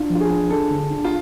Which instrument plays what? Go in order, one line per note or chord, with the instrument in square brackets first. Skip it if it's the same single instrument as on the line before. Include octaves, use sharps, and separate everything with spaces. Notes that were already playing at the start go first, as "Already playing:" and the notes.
Already playing: [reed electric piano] D4 [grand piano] F4
[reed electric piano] F3
[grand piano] F4
G#4
[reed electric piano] D4
[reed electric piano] D4 [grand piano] A4
[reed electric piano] D3
D4
[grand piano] F4